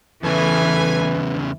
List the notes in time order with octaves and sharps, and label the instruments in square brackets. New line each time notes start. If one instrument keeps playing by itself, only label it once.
[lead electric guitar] E2 C#3 [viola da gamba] E3 [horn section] A3 G#5 [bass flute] B4